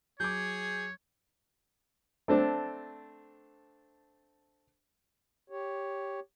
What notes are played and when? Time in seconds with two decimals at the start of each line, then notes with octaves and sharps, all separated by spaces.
0.20 F#3 G#4 C#5 D6 G6
2.28 A3 C4 D4
5.50 G4 C#5